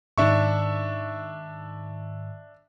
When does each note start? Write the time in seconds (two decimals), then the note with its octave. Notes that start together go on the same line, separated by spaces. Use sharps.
0.18 G#2 D#3 D4 E5 C#6